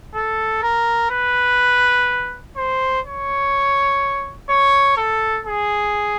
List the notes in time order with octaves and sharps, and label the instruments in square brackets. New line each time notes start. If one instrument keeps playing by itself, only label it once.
[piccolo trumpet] A4
A#4
B4
C5
C#5
C#5
A4
G#4